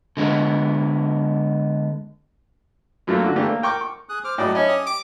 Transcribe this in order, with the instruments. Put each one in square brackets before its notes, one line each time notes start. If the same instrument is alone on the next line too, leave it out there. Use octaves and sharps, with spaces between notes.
[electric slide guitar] D3 G#3 A#3 B3
[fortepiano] F#2 F#3 A3 A#3
D3 F#4
E3 A3 A#3 D4 G4
A#3
A#4 G5 C#6 D6
C#6
[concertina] G#4 D#6 F#6
C5 D6 F6
[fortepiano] A2 F#3 [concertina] D5 D#5
[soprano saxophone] C#4 [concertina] D4 E4 [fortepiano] D#5
[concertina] G4 D#6
[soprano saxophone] D6